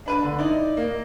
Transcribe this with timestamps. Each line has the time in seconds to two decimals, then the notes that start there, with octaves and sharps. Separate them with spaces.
0.06 D4 B4 D#7
0.23 D3
0.39 D#4 E4 D5 D#5
0.77 A#3